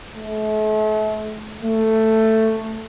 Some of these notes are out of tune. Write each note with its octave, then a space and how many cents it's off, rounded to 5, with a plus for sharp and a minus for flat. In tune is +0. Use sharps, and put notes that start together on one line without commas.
A3 -40
A3 +10